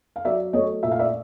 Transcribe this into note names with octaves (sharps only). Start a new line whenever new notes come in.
F5
F#3 D5 E5
A3 C#5 D#5
A#2 E5
F5
D5 E5